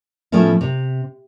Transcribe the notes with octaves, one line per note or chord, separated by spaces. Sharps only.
A2 F3 A3 B3 C#4 E4
C3